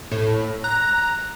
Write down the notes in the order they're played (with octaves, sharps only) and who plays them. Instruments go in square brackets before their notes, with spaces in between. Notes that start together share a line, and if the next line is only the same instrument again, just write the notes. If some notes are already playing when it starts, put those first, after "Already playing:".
[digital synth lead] A2
[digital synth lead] A#5 [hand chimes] F#6